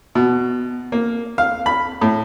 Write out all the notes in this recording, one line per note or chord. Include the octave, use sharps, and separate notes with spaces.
B2
A#3
F5
B5
A2